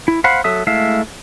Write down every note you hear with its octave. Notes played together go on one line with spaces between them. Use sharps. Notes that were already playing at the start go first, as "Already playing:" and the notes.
E4
C5 F5 F#5 B5
F#3 A4 E5 D#6
G#3 A3 E4 E5 F5